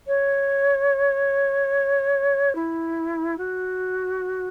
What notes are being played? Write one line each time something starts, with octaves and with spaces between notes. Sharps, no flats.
C#5
E4
F#4